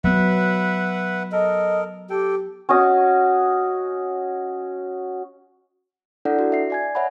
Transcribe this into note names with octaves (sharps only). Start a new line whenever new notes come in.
F#3 B3 B4 E5 F#5
A4 A#4 D#5
G4 A4 G5
C#4 F#4 D#5
D4 E4 A4 D5 F#5
F#4
E5 C7
D5 G#5 G#6
C#5 E5 F#5 B5